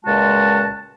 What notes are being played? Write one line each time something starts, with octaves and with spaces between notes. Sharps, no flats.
C#2 A#2 G#3 F#4 A5